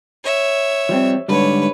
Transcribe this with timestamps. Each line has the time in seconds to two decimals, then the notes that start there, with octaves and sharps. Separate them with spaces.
0.24 C#5 E5
0.89 F3 G3 C4
1.28 G#2 D3 G3 B4 C#5